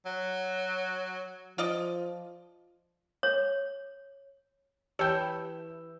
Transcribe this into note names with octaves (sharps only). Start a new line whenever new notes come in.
F#3
F3 F4 D5 D#5
C#5
E3 E4 G4 C#5 G5 A5 E6 G6